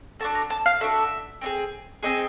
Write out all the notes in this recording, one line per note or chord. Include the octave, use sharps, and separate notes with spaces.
D4 F#4 A4 A5
A#5
A5
F5
D4 F#4 A4 E5
C4 D#4 G#4
C4 D#4 G#4 D#5